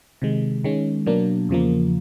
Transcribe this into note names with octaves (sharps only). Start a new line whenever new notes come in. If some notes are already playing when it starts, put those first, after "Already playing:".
C3 D#3 G#3
D#3 G#3 C#4
B2 F#3 A#3 D4
E2 C#3 F3 A#3